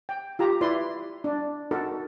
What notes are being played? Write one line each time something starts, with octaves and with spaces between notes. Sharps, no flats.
G5
F4 G4 A#5
E4 B4 D5 C6
D4
D#4 F#4 A4 A#4